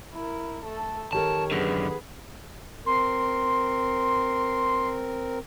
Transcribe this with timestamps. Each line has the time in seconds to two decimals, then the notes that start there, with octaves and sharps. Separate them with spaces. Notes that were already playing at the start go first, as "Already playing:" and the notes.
0.14 E4 A#4
0.65 A3 A4
1.13 D#3 G4 A4 A#4 C#5 A5
1.51 F#2 D3 B3 G#4 B4
2.86 C4 A#4 C6